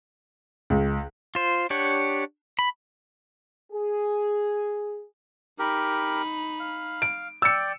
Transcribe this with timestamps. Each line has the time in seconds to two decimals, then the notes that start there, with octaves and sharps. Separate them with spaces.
0.70 C#2
1.35 F4 C5
1.70 D4 G4 C#5 F#5
2.59 B5
3.72 G#4
5.59 D#4 G4 A#4 B5
6.60 F5
7.02 D7
7.42 D5 G5 E6 C#7